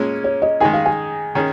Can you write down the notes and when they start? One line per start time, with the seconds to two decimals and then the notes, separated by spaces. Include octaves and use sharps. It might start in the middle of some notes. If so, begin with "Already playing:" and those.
Already playing: A#2 G#3 C#4
0.24 C#5
0.42 D#5
0.60 D#3 G#3 D#4 G#4 G#5
0.73 F5
0.85 G#5
1.35 D#3 C#4 G#4